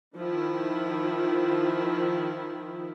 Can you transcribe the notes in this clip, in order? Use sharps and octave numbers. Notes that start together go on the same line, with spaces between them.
D#3 F3 E4